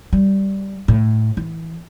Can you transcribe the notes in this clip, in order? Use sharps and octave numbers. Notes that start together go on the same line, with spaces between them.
G3
A2
E3